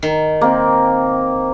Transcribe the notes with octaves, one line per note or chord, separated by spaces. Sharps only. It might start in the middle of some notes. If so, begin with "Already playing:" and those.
D#3
A#3 C4